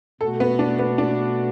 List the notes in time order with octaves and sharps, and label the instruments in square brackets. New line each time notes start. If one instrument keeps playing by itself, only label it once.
[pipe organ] B2 A3 F#4 [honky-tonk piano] A4
[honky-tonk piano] B3
D4
B3
D4